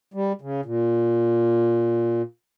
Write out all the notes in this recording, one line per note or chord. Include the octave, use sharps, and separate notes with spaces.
G3
C#3
A#2